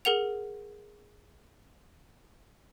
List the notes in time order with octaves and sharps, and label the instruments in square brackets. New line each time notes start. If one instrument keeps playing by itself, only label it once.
[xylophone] G#4 A#4 F#5 F7